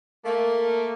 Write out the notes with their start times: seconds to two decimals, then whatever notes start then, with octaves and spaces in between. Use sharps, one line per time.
0.25 A3 A#3